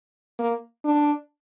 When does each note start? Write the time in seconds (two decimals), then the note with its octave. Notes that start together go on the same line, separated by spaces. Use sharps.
0.39 A#3
0.85 D4